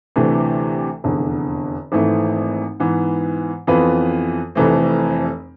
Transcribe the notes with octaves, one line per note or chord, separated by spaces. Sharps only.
D2 C3 E3 A3 D4
F1 E2 D3
G#1 G#2 E3 A3 C4
G#2 E3 B3
F2 E3 B3 F4 B4
F1 F2 E3 A3 C4